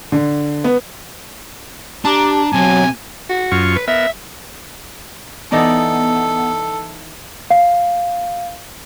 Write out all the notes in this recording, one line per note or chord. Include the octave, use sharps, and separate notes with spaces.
D3
B3
D4 G4 A5 A#5 D6
B2 F#3 C4 G#5
F#4
F#2 F4 C#6
B4
B3 A#4 E5
E3 B3 D#4 A4 D5
F5